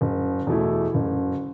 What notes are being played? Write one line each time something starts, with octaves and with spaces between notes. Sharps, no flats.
F#1
E2 B2 A3 E4
F#1